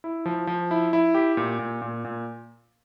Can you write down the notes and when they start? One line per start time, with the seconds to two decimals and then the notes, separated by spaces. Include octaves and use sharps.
0.04 E4
0.26 F3
0.47 F3
0.71 E4
0.93 E4
1.14 G4
1.37 A#2
1.59 A#2
1.82 A#2
2.05 A#2